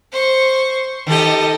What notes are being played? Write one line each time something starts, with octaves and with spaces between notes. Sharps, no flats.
C5 C#6
D#3 G4 A4 D#5